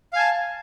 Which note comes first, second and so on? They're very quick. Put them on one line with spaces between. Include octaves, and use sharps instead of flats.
F5 G#5 A5